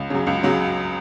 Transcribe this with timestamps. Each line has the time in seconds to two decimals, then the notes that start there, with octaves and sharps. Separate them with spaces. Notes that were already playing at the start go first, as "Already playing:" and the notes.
Already playing: C#2
0.10 C#3 F#3
0.27 C#2
0.43 C#3 F#3